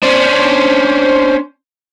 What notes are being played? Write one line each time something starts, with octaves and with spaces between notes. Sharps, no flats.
C#4 D4 C5